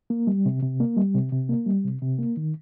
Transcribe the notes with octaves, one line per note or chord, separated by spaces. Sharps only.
A#3
G3
C3
C3
A#3
G3
C3
C3
A#3
G3
C3
C3
A#3
D#3